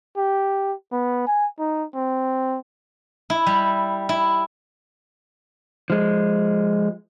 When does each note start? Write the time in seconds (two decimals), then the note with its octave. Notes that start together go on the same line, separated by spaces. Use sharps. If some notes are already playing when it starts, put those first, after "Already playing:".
0.17 G4
0.92 B3
1.27 G#5
1.59 D#4
1.95 C4
3.30 E4
3.47 G3
4.09 E4
5.90 F3 G#3